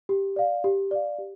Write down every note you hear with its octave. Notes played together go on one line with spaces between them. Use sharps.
G4
D5 F5
G4
D5 F5
G4